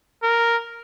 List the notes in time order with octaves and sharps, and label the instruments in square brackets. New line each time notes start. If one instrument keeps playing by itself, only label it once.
[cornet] A#4